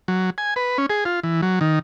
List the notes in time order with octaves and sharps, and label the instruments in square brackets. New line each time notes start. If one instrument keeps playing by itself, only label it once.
[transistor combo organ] F#3
G#5
B4
C#4
G#4
F4
E3
F#3
D#3